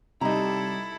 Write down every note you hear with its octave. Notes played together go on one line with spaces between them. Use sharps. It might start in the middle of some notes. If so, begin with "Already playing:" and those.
C3 G3 D#4 E4 A4 D#5 A#5